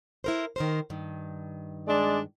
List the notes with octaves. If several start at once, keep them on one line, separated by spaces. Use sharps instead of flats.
E4 A#4 C5
D#3 A#4 C5
G2 D#3
G#3 D4 D5